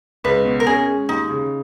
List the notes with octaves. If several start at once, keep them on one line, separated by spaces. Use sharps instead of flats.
C#2 B4
B2
A#4
C#4 G#4
G#3
D#2 D#4
C#3